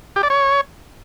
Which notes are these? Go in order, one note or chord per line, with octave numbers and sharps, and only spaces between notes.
G4
D5
C#5